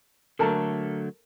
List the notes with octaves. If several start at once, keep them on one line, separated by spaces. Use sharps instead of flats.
D3 F#3 A3 A4 A#4 A5